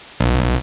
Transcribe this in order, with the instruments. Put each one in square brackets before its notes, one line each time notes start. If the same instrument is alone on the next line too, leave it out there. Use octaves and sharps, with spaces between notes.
[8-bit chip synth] B1